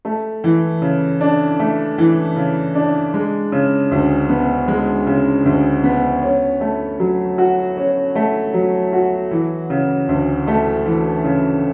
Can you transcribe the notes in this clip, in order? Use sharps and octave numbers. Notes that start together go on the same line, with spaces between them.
A3
E3
C#3
D4
A3
E3
C#3
D4
G#3
C#3
D2
B3
G#3
C#3
D2
B3
C#4
A3
F#3
F#4
C#4
A3
F#3
F#4
E3
C#3
D2
A3
E3
C#3